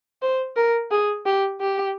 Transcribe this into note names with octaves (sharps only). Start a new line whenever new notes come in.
C5
A#4
G#4
G4
G4